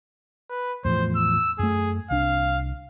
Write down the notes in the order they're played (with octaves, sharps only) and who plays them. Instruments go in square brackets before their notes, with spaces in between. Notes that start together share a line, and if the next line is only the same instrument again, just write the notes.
[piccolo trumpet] B4
[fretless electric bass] E2 A2 F3 [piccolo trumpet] C5
[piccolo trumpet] E6
[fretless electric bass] F#2 A3 [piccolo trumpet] G#4
[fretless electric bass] C2 D4 [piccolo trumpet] F5